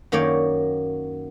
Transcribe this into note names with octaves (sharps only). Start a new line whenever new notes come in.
F#2 D#3 A#3 C#5 D5 G5